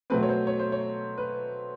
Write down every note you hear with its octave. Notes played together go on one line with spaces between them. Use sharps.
B2 F#3 A3 C4 B4
C#5
C5
C#5
C5
C#5
B4